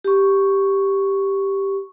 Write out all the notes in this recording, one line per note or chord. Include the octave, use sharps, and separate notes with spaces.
G4 C#6